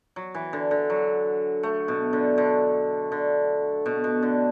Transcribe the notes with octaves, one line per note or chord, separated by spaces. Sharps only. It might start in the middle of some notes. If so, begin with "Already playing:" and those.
F#3
E3
D3
D3
F#3
A3
B2
D3
D3
D3
B2
B2
D3